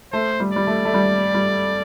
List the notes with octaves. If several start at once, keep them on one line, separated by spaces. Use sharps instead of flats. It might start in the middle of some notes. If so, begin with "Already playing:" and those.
A3 C5
G3
G3 D5
A3
A3
G3
G3